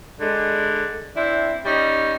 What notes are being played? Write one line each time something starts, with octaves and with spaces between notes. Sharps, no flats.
D3 G3 G#3
C4 D4 E4
G3 C#4 D#4